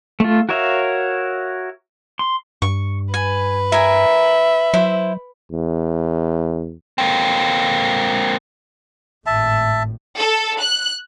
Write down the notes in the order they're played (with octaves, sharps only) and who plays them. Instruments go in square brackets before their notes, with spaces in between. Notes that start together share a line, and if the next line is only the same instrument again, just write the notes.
[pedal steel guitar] A3 F4
F#4 A#4 C#5 E5 F5
C6
[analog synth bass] G2 [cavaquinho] C#6
[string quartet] B4 [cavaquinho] G#5
[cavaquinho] A#4 G#5 [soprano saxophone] E5
[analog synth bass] F#3 [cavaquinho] E4 C5
[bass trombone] E2
[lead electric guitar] A#3 C4
[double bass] G#1 A2 [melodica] E5 A5
[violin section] A4
F#6